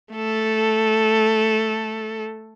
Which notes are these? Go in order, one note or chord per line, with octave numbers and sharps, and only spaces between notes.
A3 A4